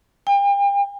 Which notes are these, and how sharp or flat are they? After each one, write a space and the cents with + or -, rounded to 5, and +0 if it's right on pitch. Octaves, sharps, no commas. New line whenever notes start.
G5 +40